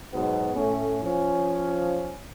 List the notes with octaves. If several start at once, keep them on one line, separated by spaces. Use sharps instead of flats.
G#2 B2 F#3 B3
A2 A3 C#4
F3 C#4